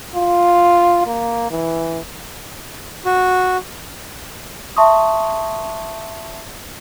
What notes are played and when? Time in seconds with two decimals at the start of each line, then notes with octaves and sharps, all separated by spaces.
0.15 F4
1.07 A#3
1.51 E3
3.05 F#4
4.76 E5 A5 C6 C#6 D#6